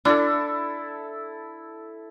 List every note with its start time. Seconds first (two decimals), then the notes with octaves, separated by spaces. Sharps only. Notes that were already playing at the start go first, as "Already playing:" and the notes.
0.05 D4 E4 A4